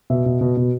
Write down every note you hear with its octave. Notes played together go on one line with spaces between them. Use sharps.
B2 E5
B2
B2
B2